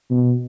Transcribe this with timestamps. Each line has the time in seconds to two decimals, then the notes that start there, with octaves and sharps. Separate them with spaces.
0.10 B2